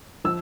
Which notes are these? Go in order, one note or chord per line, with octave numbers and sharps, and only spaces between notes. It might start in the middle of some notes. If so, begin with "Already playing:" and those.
F3 E6